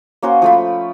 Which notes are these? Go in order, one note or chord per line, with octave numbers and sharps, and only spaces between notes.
A#3 C#4 F#4 C5
F3 A3 B5